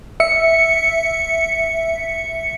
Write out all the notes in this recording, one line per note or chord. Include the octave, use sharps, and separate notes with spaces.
E5 C#7